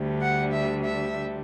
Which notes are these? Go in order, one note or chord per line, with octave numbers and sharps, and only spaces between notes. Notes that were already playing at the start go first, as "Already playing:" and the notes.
Already playing: D2 D3 G3
F#5
E5
E5